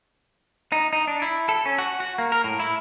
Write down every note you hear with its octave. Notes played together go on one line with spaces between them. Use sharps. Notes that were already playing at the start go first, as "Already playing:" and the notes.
D#4
D#4
D4
E4
A4
C#4
F#4
F#4
A#3
A#4
A2
E4